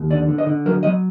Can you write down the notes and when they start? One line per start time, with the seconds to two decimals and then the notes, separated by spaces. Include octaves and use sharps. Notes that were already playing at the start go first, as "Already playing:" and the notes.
Already playing: D#2
0.10 D3 D5
0.28 D3
0.38 D#5
0.47 D3
0.66 F#3 A#4
0.83 F#3 D#5